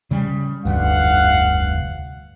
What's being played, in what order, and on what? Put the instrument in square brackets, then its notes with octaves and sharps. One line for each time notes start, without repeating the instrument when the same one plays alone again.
[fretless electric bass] C#3 G3
[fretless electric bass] F1 D2 G2 [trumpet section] F5 F#5